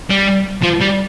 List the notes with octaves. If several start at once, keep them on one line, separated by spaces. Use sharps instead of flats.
G3
F3
G3